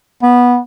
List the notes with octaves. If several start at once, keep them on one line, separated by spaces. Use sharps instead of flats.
B3